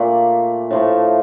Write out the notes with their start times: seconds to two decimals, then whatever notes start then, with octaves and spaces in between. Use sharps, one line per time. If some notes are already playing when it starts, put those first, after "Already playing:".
Already playing: A#2 A3 D5
0.70 A2 F3 A3